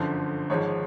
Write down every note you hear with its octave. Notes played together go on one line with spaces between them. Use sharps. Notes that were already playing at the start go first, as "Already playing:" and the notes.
Already playing: G1 F#2 D3 F3
G#1 G#2 F3 G#3 C#5